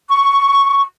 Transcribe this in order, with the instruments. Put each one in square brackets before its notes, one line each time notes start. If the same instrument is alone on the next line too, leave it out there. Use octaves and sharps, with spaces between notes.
[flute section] C#6